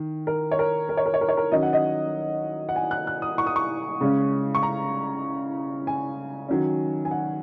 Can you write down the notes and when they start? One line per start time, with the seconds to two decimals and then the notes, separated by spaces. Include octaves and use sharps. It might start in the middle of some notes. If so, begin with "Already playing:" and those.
Already playing: D#3
0.27 A#4
0.51 C#5
0.59 A#4
0.89 A#4
0.97 C#5
1.06 A#4
1.14 C#5
1.21 A#4
1.29 C#5
1.37 A#4
1.52 D#3 F#3 C#4 D#5
1.63 F#5
1.73 D#5
2.69 F#5
2.76 G#5
2.91 F#6
3.07 F#6
3.22 D#6
3.38 C#6
3.47 D#6
3.56 C#6
4.01 C#3 G#3 C#4
4.55 C#6
4.63 A#5
5.87 G#5
6.49 D#3 F#3 C#4
7.05 G#5
7.11 F#5